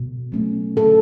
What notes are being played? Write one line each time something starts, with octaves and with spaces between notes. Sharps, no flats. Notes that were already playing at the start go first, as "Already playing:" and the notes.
Already playing: B2
F#3 A3 C#4
D3 A4